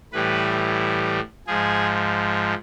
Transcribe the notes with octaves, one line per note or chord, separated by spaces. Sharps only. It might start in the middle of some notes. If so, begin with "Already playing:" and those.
A2 E3 G3 B4
G#2 F3 G#4